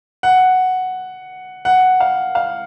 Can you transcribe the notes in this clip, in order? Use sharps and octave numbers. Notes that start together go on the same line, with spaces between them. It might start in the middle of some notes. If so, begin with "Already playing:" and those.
F#5
F#5
F5
F5